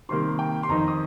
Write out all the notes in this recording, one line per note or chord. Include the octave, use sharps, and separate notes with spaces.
C3 D#3 G3 A#3 C6
G5
C6
F2 D#3 C4 D#4 A#5
D#6